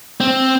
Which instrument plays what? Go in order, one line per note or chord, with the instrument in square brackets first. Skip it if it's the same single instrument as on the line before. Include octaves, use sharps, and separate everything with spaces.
[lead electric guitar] C4